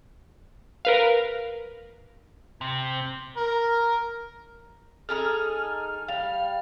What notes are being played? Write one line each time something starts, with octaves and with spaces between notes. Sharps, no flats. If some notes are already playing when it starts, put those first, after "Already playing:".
A#4 B4 F5
C3
A#4
D#4 G#4 A4 F6
G3 F5